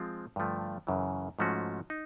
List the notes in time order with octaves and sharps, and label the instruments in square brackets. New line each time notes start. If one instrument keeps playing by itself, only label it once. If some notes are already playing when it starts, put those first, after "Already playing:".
Already playing: [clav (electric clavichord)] F3 G#3 C4 F4
G2 D3 F3 A3
F#2 C#3 E3
G#2 F3 A3 C#4 F#4
D#4